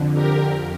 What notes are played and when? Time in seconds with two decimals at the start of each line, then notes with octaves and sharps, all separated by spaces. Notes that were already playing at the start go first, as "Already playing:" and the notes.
Already playing: F2 D3
0.14 G4 A#4
0.44 F2